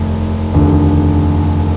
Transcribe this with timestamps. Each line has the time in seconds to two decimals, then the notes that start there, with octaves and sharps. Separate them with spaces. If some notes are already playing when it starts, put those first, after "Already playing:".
Already playing: F1 D#2
0.54 F1 D#2 D3